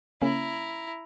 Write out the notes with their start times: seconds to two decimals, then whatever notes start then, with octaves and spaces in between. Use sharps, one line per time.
0.22 C#3 A#3 C#4 E4 A#5